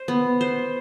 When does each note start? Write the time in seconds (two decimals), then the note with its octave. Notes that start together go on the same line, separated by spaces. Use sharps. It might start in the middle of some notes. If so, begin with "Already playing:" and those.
Already playing: C5
0.08 B3
0.41 C5